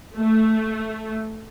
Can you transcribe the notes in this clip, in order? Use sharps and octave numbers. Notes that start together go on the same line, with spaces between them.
A3